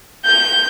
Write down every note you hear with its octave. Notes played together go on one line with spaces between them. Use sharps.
G6